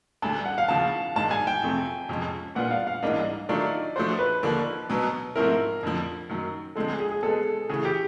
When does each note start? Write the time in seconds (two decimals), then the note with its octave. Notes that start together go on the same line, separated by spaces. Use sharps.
0.22 D2 D3 G3 A5
0.46 F#5
0.58 F5
0.68 D#2 C#3 F3 A5
1.15 G2 D#3 G#3 A5
1.31 G#5
1.47 G5
1.62 F2 C3 F3 A3 C4
2.09 F2 C3 F3 G#3 C#4
2.55 A#2 G3 B3 D4 F4 F#5
2.71 F5
2.87 F5
3.03 G#2 E3 G3 A#3 D4 D#5
3.49 D#3 F#3 A3 D4 F4 D5
3.96 F3 A3 D4 F#4 C5
4.19 B4
4.43 D#2 D3 F3 A#3 D4
4.90 B2 F#3 B3
5.36 G#2 F3 A3 C4 E4 A#4
5.83 F2 D3 F3
6.29 F#2 D#3 F#3
6.75 D3 F3 G#3 C4 A4
6.88 G#4
7.00 G#4
7.12 G#4
7.23 B2 G#3 B3 A4
7.69 C#3 E3 A3 G#4
7.85 G4